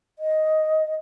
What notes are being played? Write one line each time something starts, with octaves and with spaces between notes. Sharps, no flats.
D#5